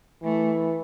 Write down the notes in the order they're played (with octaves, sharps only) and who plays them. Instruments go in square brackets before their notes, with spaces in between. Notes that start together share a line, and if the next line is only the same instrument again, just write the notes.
[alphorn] E3 [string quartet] A3